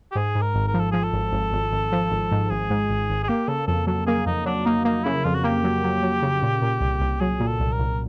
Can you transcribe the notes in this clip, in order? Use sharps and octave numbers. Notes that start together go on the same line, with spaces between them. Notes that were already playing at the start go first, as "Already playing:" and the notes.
G4
G#2 G#4
G#2
A#4
G#1
A#4
F3
A4
F3 G#4
A4
G#1
G#1
G#1
G#1
F3
G#1
G#2
G#1 G#4
G#2
G#1
G#1
G#4
A#3 G4
C#3 A4
F2 A4
F#3 A4
A#3 G#4
F2 D#4
F#3 D4
A#3 D#4
A#3 D#4
C#3 E4
F2 F4
F#4
A#3 G4
F#3
F#3
F#3
C#3
A#2
A#2
C2
C2
F#3 G#4
A#2
A4
C2
A#4
C2